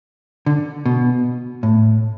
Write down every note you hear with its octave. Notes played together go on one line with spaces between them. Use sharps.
D3
B2
A2